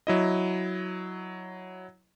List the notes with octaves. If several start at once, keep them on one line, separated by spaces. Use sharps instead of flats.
F#3 E4 D#5